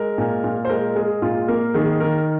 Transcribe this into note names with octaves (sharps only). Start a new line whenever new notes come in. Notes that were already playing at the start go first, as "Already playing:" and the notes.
Already playing: G#3 A#4
A#2
A#2
C5
G#3 A#4
G#3 G#4
A#2 F4
A#3 A#4
D#3 G#4
D#3 A#4